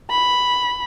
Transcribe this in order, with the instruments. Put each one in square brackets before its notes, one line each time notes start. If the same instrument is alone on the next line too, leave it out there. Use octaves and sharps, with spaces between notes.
[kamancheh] B5